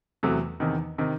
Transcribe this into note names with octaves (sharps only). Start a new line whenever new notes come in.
E2 C3 F#3 A3
E2 C3 D#3
C3 D#3